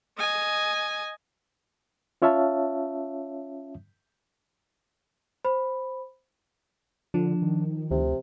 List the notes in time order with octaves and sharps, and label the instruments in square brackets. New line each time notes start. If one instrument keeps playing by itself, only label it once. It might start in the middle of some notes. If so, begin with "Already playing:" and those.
[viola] D#5 G#5
[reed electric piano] C#4 F4 C#5 E5 F5 A5
[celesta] C5 B5
[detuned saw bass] D3 [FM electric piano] F3 [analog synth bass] D4
[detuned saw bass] D#3
[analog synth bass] D2 [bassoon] C3